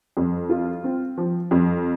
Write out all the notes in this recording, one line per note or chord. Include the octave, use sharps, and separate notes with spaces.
F2
F4
C4
F3
F2